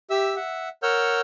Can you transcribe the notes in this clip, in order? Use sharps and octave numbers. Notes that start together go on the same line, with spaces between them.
G4 E5 E6
E5 F#5
A#4 C#5 F#5 E6 F6 G6